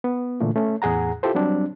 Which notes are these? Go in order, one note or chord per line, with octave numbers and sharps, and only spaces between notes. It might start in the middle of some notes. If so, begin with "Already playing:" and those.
B3
A#2 D3 E3 A3 A#3
A3 C#4
E2 A2 G#4 F#5 A#5
E4 F4 G4 A4 C5
F#3 G3 C4 D4